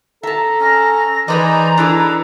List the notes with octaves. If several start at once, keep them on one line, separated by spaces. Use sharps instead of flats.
A4 E5 A5 A#5
C#4 A#6
E3 D#4 G#4 B4 C5 D5 D#5 A#5
D4 E4 G#4 A4 B4